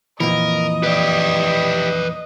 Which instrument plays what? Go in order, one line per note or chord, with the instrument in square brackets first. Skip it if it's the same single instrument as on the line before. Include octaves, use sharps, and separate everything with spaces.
[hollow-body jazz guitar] F2 A#2 E3 [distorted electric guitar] A#4 [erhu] D#5
[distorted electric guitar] E4 G4 [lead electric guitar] B4 D5